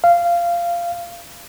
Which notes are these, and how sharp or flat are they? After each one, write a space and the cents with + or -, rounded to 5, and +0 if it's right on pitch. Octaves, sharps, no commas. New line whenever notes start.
F5 -15